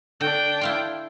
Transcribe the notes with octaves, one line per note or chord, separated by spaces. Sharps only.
D3 D4 G5
E4 F5 C6